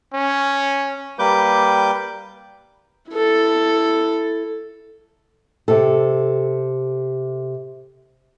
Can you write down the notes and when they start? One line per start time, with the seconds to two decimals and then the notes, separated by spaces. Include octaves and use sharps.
0.13 C#4
1.19 G3 A#3 B4 D6 G6
3.11 E4 A4
5.68 C3 A4